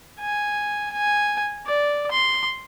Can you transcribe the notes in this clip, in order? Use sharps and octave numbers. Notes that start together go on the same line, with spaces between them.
G#5
G#5
D5
C6